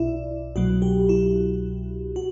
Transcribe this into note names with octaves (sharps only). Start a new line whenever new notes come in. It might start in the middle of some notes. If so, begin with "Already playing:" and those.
Already playing: B1 B2 E4 D5 E5
C2 B2 F#3 F#4
G4
E4
F#4